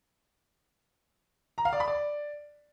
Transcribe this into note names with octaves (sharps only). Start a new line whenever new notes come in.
A#5
F5
D5
B5
D5